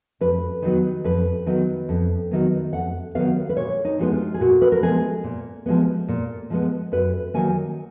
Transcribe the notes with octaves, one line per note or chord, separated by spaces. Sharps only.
F2 B4
D#3 F#3 B3
F2 B4
D#3 F#3 B3
F2
D#3 F#3 B3
F2 F#5
D#3 F#3 B3 F5
B4
A#2 C#5
D#4
F3 G#3 B3 F#4
F4
G#4
A#2 F#4
B4
A#4
F3 G#3 B3 G#4
A#2
F3 G#3 B3
A#2
F3 G#3 B3
F#2 B4
D#3 F#3 A#3 G#5